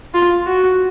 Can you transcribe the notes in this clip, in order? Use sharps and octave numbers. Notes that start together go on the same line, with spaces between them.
F4
F#4